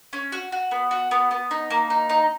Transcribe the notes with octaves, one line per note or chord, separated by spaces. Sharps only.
C#4
F#4
F#4
B3
F#4
B3
B3
D#4
A#3
D#4
D#4